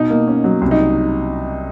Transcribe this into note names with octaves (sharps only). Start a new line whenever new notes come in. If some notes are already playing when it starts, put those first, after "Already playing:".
Already playing: B2 D#4
A#3
C#4
F#3
C2
D#4